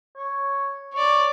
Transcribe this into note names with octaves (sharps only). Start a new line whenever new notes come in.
C#5
C#5 D5 C#6